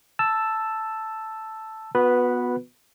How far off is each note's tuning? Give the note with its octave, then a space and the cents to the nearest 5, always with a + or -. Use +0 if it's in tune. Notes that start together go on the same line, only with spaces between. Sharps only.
A5 +0 E6 +5
B3 +0 F#4 -35 B4 -5